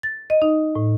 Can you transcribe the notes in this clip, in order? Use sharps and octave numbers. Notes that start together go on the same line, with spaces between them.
A6
D#5
D#4
A2